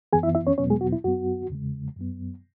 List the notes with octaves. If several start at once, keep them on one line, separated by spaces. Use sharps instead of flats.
F#2 E3 B3 G#4 G#5
E4 E5
E4 E5
C#4 C#5
E2 B2 F#3 B3 C#4 C#5
G#3 G#4
F#4
E4
F#2 F#3 B3 F#4
E2 C#3 G#3
F#2 F#3 B3